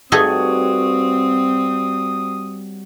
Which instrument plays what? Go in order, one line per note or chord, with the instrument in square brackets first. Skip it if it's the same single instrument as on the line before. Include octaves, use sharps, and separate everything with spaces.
[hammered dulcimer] G2 F#4 C#5 [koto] A3 D#4 G#4 [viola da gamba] C4 [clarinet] D#6